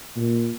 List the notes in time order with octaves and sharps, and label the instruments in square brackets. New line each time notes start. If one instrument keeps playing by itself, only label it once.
[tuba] A#2